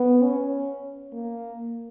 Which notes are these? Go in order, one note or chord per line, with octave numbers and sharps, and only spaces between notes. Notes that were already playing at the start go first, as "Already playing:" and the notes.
Already playing: B3
C#4
A#3